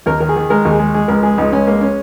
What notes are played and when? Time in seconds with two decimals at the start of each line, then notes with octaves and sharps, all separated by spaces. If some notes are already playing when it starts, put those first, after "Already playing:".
0.06 D#2 A#4
0.21 D#3 A#4
0.29 G#4
0.36 D#3
0.50 G#3 A#4
0.65 D#2
0.72 G#4
0.79 G#3
0.94 G#3 G#4
1.08 C#2 A#4
1.23 G#3 G#4
1.38 C#2 D#4
1.52 C#2 C#4
1.67 G#3 A#3
1.81 C#4